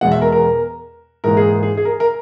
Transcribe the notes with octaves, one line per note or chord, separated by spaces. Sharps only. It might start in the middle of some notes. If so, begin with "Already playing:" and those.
E2 B2 G#3 B3 F#5
E5
A#4
A#4
G#2 E3 A#3 A#4
G#4
G#4
G#4
A#4
A#4